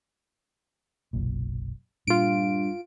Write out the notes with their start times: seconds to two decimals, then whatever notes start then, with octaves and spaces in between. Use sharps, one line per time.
1.13 F#1 B1 A#2
2.07 G2 A#2 F4 D7